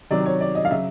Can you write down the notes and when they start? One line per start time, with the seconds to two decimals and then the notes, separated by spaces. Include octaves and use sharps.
0.11 C3 D#3 F#3 D5
0.26 C#5
0.41 D5
0.55 D#5
0.65 F5
0.71 C#3 F#3 E5